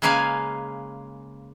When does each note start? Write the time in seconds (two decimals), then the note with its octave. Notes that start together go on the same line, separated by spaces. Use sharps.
0.02 C#3 G#3 A#3 B4 F5 G#5